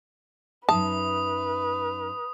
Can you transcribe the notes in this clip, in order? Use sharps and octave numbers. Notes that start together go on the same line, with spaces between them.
F#2 D#4 B4 E5 A5 D#6